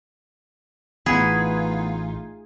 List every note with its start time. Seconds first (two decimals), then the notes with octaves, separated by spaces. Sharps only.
1.06 A1 E3 A3 B3 D#4 F4 G#4